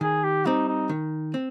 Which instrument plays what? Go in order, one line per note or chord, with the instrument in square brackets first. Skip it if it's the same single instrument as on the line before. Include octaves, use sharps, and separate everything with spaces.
[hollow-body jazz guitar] D#3 [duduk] G#4
[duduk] G4
[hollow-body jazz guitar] G3 C4 [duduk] D#4
[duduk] D#4
[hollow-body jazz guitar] D#3
C4